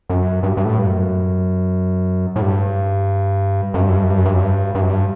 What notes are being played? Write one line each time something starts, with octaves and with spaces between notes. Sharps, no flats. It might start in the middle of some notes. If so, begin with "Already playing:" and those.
F#2
G2
G2
A2
G2
F#2
A2
G2
F#2
G2
F#2
G2
F#2
G2
F#2
G2
F#2
G2
G2
F#2
G2